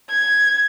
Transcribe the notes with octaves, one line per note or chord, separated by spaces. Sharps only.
G#6